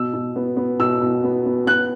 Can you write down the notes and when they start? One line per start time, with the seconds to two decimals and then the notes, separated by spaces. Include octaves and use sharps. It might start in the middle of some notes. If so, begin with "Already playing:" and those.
Already playing: B2 E6
0.13 B2
0.36 B3
0.57 B3
0.79 B2 E6
1.01 B2
1.24 B3
1.46 B3
1.67 B3 F#6